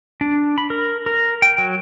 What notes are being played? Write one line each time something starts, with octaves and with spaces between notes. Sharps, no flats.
D4
B5
A#4
A#4
G5
F#3